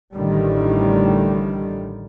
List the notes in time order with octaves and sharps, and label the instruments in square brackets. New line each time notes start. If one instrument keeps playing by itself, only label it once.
[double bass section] A1 A2 D3 D#3 G3